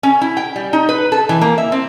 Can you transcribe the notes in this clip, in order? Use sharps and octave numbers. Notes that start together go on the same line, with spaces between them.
C#4
E4
G5
G3
D#4
B4
A4
E3
A#3
E5
C4